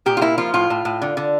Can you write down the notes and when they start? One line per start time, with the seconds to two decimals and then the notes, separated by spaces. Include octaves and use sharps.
0.06 A#2 G4
0.17 F4
0.21 A#3 E4
0.38 F3 F4
0.54 A2 F4
0.70 A2
0.85 A2
1.02 D3
1.17 D3